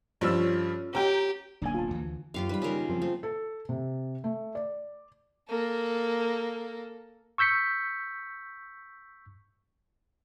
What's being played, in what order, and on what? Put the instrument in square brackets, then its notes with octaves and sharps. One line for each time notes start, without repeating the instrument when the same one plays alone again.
[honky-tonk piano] G2 F3 E6 [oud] C#4 F4 A4
[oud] C#4 [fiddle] G4 [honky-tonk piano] G5 A#5
[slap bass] D1 B1 A#3 [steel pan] D4 G#5
[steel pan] F4 A5
[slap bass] D2 E3
[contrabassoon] F#1 [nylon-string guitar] F#2 [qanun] F4 G4 F5
[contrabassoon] G#2 [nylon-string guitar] G3 C5 [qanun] B4 B5
[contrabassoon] D#2 [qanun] C#3 A#4
[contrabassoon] A#2 [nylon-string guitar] F3 C4 C5
[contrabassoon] F3 [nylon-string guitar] A3 [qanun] C4
[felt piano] A4
C3
A3
D5
[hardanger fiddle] A#3 A4
[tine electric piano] C#6 E6 G6 B6 C#7